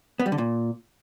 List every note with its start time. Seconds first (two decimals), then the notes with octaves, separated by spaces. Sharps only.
0.20 B3
0.26 G3
0.32 D3
0.38 A#2